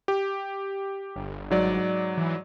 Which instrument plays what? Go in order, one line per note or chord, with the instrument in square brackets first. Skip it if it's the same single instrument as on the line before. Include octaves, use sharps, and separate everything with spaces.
[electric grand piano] G4
[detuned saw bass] G1
[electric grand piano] G#2 F#3 D5
[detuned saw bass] E3